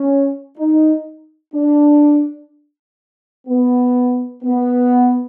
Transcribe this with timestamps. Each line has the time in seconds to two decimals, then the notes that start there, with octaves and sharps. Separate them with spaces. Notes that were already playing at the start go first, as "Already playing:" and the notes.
Already playing: C#4
0.58 D#4
1.54 D4
3.48 B3
4.43 B3